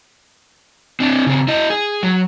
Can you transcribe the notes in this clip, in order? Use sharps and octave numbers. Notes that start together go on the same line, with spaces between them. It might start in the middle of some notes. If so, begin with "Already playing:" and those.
C4 D4
C#3 C4
E4 D#5
G#4
F#3